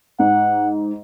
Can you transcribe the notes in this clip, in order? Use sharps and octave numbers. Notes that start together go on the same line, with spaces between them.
G#2 F#5